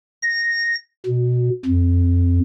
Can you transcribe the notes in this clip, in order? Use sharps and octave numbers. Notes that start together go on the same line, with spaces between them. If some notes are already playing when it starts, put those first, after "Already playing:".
A#6
B2
F2